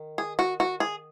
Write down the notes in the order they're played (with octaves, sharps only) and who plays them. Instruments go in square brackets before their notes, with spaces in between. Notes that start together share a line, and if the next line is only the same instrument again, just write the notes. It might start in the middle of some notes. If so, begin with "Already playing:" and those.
Already playing: [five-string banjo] D#3
G#4
F#4
F#4
G#4